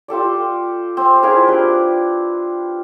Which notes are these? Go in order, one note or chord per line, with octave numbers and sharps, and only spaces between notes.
F4 G4 A4 D5
C4
E4 F4 G#4 A#4
D4 G4 B4